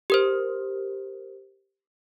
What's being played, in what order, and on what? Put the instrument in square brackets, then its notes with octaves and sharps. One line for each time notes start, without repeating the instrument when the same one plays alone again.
[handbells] G4 A#4 C5